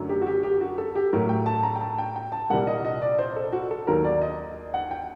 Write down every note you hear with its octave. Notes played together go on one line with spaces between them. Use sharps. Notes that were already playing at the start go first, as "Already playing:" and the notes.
Already playing: F#2 D3 F#3 A3
G4
F#4
G4
G4
F#4
A4
G4
A2 F#3 A3 A#4
G5
A5
A#5
G5
A5
G5
G5
A5
C2 A#2 G3 A#3 F#5
D#5
D#5
D5
C5
A4
F#4
A4
D#2 D#3 F#3 A#4
D5
D#5
F#5
G5